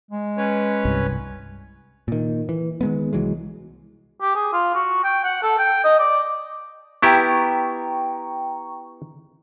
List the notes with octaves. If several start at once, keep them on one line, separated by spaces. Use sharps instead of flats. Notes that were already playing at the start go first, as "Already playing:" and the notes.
G#3
C#4 B4 C#5
C2 G2
A#2 D#3
E3
D#3 G#3 B3
C2 E3 F#3 G#3
G4
G#4
F4
F#4
G5
F#5
A4
G5
D#5
D5
B3 E4 G4 G5 A#5 C#6